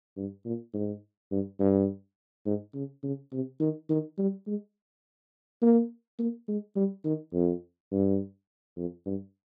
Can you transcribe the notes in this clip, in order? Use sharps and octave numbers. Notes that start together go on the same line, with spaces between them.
G2
A#2
G#2
G2
G2
G#2
C#3
C#3
C3
D#3
D#3
G3
G#3
A#3
A#3
G#3
G3
D#3
F2
G2
F2
G2